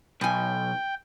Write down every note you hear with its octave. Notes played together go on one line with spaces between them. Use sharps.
B1 B2 G5 G#5